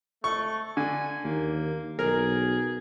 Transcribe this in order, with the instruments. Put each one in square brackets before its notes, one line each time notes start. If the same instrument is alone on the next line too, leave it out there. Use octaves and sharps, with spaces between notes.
[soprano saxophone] A3 [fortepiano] C#6
[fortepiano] D3 [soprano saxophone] G#5
[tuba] D#2 [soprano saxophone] A#3
[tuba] B1 [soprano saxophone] G#4 [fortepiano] A#4